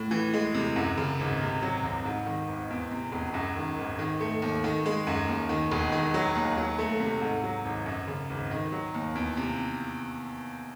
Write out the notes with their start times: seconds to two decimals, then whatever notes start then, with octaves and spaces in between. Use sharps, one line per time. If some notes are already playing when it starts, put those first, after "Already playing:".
Already playing: A2
0.11 E3
0.34 G#3
0.54 C3
0.76 F#2
0.97 C#3
1.19 G#1
1.41 C3
1.62 F#3
1.83 C2
2.05 G#2
2.26 D#3
2.48 G#1
2.70 E2
2.91 C3
3.12 E1
3.34 F#2
3.56 D#3
3.77 G#1
3.99 D#3
4.20 A3
4.42 D#2
4.64 D#3
4.86 G#3
5.07 F#2
5.28 D#2
5.49 D#3
5.72 E1
5.92 D#3
6.14 F#3
6.35 D#2
6.57 F#3
6.79 A3
7.00 C3
7.21 G#2
7.44 F#3
7.65 G#1
7.86 F#2
8.07 C#3
8.30 G#1
8.51 D#3
8.72 F#3
8.94 D#2
9.15 E2
9.37 C3